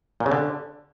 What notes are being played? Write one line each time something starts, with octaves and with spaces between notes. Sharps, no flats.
A#2
C#3
D3